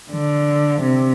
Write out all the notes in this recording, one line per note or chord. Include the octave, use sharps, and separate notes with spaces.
D3
C3